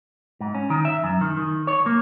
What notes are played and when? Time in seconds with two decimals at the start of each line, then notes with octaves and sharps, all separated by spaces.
0.40 G#2
0.55 C#4
0.70 D#3
0.85 E5
1.04 F#2
1.21 D#3
1.37 D#3
1.67 C#5
1.86 A#3